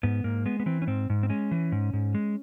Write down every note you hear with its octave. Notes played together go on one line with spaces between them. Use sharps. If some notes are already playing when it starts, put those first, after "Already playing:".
G#2 B3
G#2 A#3
G#3 B3
B3
E3 C4
C#4
G#2 C4
G#2
C4
G#3 C#4
E3
G#2
G#2
G#3